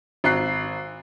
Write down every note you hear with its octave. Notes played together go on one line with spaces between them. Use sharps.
G#1 F#6 C7